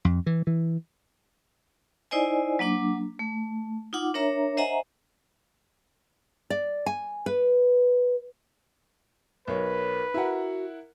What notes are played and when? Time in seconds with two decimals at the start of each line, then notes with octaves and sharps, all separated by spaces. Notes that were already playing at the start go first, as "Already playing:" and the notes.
0.05 F2
0.26 E3
0.47 E3
2.11 D#4 E4 C5 D5 D#5 G#5
2.59 F#3 A#3 D4 D6
3.19 A3
3.93 D#4 F4 F#5 D6
4.14 D4 A#4 C#5 E5 A#5
4.57 C5 D#5 E5 F#5 G#5 A#5
6.50 D5
6.86 G#5
7.26 B4
9.48 B1 A#4 B4 C#5
10.14 E4 F#4 A#4 F#5